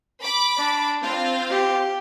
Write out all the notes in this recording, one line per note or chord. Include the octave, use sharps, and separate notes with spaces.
B5 D6
D4
C4 F4 F5
G4